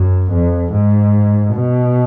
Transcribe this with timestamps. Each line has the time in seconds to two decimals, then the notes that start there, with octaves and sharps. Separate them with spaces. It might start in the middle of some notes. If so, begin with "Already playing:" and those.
Already playing: F#2
0.31 F2
0.72 G#2
1.54 B2